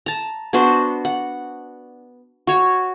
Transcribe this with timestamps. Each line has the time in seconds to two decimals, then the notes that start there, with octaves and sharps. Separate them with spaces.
0.06 A5 A#5
0.53 B3 D4 F#4 C5
1.05 F#5
2.47 F#4 C#5